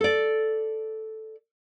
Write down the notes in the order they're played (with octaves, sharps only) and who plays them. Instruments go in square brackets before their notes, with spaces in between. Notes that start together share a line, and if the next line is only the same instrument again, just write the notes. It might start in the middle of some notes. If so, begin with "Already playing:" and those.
[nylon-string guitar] A4 D5